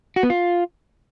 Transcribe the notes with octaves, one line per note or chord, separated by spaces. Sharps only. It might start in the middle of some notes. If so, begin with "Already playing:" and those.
F#4
B3
F4